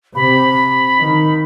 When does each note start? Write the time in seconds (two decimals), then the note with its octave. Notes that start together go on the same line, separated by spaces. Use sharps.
0.15 C3 B5
0.98 D#3